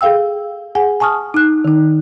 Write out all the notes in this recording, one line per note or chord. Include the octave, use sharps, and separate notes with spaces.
G#4 A4 F5 G5 E6
G#4 F#5 G#5
G#5 A5 C#6 D#6 F6
D#4 F#6
D#3 D#4